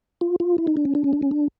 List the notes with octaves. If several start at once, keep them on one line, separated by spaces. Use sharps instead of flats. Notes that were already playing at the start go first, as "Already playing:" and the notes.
F4
F4
E4
D#4
D4
C#4
D4
C#4
D4
C#4
D4